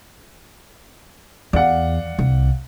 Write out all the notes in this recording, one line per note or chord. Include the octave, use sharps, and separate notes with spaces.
E2 D5 F5 F#5
C2